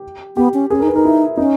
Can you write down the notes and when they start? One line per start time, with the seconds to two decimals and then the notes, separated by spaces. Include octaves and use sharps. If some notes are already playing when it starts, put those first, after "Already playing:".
Already playing: G4
0.36 B3 G4
0.54 C#4
0.70 C#4 G#4
0.79 D#4 A#4
0.87 B4
0.93 D#4 A#4
1.05 E4
1.37 C#4 D#4